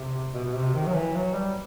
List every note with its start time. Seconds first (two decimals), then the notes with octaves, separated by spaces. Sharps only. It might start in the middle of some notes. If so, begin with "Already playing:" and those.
Already playing: C3
0.34 B2
0.45 B2
0.54 C3
0.74 D#3
0.86 F#3
0.94 E3
1.15 F#3
1.35 G3